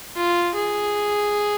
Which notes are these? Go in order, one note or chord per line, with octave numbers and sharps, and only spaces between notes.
F4
G#4